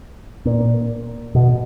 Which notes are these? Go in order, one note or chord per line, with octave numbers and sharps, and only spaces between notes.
A#2
B2